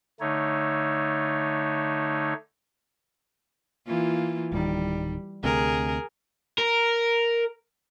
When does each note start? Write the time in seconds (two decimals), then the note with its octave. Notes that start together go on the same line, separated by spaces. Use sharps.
0.20 D3 A3 D#4 C#5
3.87 E3 A#3 F4
4.52 D1 D#3 G3
5.44 D2 C3 G#4 A#4
6.58 A#4